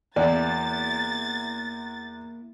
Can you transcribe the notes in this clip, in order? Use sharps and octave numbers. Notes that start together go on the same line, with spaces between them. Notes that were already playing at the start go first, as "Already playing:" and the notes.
E2 A#3 E4 D5 A6